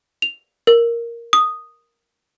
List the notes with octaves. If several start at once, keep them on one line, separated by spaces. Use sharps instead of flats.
F7
A#4
D#6